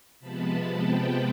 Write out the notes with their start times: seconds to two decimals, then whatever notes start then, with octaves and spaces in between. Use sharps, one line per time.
0.20 C3 F3 G#3 B3 A5 B5
0.72 G5 A5